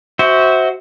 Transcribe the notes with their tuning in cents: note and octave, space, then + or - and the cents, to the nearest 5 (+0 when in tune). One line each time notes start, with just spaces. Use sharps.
F#4 +10 C5 +0 E5 -25